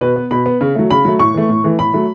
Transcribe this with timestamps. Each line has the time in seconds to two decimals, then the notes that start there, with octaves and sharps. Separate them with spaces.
0.01 B2 B4
0.16 B3
0.31 B2 B5
0.46 B3
0.61 C#3
0.75 F#3 A3
0.91 C#3 B5
1.05 F#3 A3
1.19 A2 C#6
1.34 E3 A3
1.49 A2
1.64 E3 A3
1.79 A2 B5
1.94 F#3 A3